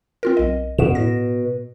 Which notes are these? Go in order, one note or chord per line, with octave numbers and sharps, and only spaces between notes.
C4 F4 A#4
B1 D#5
F#2 B2 E7
A2 A#6